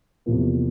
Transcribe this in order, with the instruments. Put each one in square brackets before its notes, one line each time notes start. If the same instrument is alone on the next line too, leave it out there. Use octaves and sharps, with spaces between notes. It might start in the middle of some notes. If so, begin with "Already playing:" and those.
[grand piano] E2 C3 F3 A#3